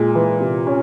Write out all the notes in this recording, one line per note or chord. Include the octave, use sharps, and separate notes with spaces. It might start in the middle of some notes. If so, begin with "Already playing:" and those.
Already playing: A#2 G#3
E3
C3
C#4